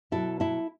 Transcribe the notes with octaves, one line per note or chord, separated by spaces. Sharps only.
B2 F#3 E4 A4
E4 A4